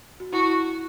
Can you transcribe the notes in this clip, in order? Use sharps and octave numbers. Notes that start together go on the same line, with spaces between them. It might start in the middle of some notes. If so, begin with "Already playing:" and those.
F#4
E4 F#4